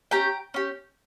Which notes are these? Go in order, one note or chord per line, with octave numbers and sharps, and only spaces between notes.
C#4 G4 G5 A#5
C#4 G4